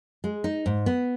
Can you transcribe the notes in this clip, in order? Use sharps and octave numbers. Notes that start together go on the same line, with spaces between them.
G#3
D#4
G#2
B3